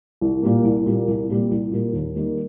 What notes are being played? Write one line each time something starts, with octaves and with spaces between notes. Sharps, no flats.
C2
A#2 G3 A#3
C2
A#2 G3 A#3
C2
A#2 G3 A#3
C2
A#2 G3 A#3
D#2
D#3 G3 A#3